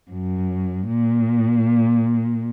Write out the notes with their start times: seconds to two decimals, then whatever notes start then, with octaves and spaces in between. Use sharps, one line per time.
0.11 F#2
0.88 A#2